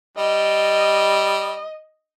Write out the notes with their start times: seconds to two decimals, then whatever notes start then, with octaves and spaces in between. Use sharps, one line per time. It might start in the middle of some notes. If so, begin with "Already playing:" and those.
0.17 G3 D#5